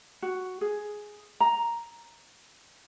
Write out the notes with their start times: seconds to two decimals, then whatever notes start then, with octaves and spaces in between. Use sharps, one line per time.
0.22 F#4
0.61 G#4
1.40 A#5